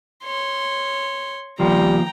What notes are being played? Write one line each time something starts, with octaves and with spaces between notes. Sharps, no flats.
C#5 C6
D#2 F3 G3 G5 A#5